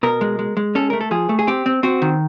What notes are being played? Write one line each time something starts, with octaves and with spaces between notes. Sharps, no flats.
B2 A#4
G#3
G#3
G#3
C#4 A4
A3 A#4
A4
F3 G#4
A3
G#4
C4 G4
C4
C4 F#4
D#3